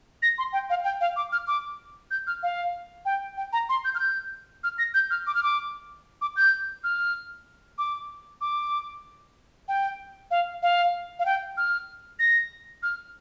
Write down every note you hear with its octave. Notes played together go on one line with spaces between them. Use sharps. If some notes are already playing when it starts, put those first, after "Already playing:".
A#6
C6
G5
F5
G5
F5
D6
F6
D6
G6
F6
F5
G5
G5
A#5
C6
G6
F6
G6
F6
A#6
G6
F6
D6
F6
D6
D6
G6
F6
D6
D6
G5
F5
F5
F5
G5
F6
A#6
F6